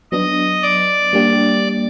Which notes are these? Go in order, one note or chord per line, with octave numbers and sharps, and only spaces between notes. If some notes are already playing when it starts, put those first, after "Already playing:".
F#3 B3 D4 D#5 D#6
D5 D6
G3 A#3 D4 G4